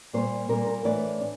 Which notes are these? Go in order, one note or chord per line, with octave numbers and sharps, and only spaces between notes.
A#2 G3 A#3 C5
A#2 G3 A#3 A#4
A#4
A2 E3 A3 D4 D5
D4